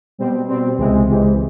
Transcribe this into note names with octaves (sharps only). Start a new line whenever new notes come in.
B2 G3 C4
B2 G3 C4
C#2 C3 E3 G#3 C4
C#2 C3 E3 G#3 C4